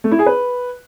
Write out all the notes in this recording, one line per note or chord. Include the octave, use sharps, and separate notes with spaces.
A3
E4
G#4
B4